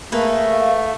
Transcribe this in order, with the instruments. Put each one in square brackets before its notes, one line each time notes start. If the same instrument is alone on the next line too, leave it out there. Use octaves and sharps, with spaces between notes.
[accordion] A3 [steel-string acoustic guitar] A#3 G#4 B4 [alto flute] F5